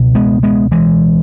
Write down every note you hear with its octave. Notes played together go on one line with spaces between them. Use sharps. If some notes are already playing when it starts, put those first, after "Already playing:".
Already playing: C#2 B2
G#3 B3
G#3 B3
E3 G#3